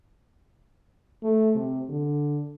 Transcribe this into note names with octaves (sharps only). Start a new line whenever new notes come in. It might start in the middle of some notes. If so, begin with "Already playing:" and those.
A3
C3
D3